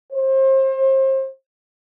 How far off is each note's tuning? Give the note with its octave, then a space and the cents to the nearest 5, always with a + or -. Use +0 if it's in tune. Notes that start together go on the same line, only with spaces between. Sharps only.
C5 +35